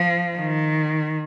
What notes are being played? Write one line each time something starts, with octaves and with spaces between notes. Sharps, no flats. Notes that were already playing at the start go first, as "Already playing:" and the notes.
Already playing: F3
D#3